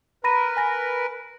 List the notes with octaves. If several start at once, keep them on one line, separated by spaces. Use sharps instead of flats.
A#4 B4 B5 A#6 D#7
G#5 A#6